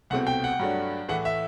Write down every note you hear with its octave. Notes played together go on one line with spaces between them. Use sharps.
C2 B2 A3 C4 F#5
G5
F#5
G2 F#3 A3 D4
A2 E3 A3 E4 F#5
E5